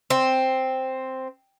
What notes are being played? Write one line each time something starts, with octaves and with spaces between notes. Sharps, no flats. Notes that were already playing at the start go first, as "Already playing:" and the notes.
C4